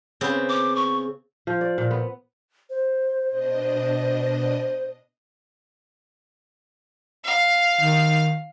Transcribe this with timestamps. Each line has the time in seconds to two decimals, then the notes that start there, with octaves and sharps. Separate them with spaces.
0.21 C#3 B3 C4
0.49 D6
0.76 C#6
1.47 F3
1.61 D5
1.78 A#2
1.91 B3
2.70 C5
3.30 B2 D4 D#5
7.25 F5
7.81 D#3